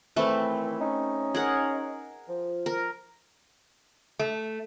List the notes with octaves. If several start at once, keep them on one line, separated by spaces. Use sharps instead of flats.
A2 D#3 E3 A3 C4 B4
C#4 D#4
G#4 A#4 F#5
F3
A#4
A3